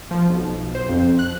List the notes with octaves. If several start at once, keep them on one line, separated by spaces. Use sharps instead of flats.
F3
B1
C5
F2
F#6